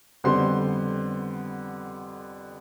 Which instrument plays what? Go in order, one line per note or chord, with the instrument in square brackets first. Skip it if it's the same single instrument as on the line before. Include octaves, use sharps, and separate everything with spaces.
[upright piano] F2 D3 G3 B3 C5 C6